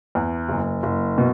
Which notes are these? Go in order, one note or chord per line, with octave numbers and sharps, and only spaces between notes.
E2
F#1
F#1
B2